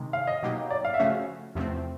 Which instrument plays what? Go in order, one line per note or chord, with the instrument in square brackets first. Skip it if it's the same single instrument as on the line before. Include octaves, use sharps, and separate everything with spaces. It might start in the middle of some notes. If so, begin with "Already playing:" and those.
Already playing: [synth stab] C3 D#3 G#3
[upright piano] F5
D#5
[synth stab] B2 F#3 A#3 D#4 G4
[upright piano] D5
F5
E5
[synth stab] C#3 F3 A3 C#4 F#4 [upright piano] F5
[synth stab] E2 C3 F3 A3 C4